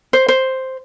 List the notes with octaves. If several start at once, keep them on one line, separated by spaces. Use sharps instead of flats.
C5
C5